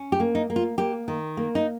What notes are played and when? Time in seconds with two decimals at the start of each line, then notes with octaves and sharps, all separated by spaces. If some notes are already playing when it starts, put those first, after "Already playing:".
Already playing: C#4
0.12 G4
0.20 A#3
0.35 D#4
0.50 A#3
0.56 F4
0.78 A#3 G4
1.08 D#3
1.37 A#3
1.55 D#4